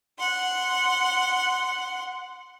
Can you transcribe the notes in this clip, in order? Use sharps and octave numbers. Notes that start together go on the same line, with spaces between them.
F#5 C6